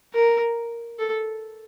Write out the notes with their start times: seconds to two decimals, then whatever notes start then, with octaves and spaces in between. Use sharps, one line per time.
0.14 A#4
0.99 A4